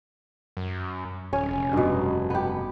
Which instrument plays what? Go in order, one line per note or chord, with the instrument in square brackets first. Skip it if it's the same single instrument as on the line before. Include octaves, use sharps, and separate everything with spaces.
[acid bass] F#2
[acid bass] D#1 [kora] C#4
[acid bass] F1
[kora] G2 B2
B3 G4